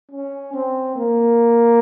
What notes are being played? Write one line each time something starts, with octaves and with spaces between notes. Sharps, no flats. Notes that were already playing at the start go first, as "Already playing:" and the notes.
C#4
C4
A#3